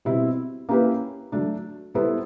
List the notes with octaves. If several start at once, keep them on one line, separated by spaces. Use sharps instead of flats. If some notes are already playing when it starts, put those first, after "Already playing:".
B2 G3 C4 E4
A#3 C#4 E4 G4 B4
F#3 A3 D4
G3 B3 E4 A4 C5